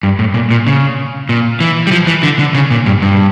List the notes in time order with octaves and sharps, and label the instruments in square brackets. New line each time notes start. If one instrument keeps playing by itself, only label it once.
[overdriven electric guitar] G2
A2
A#2
A#2
C#3
A#2
E3
G3
F3
E3
D3
D3
C#3
A#2
G2
G2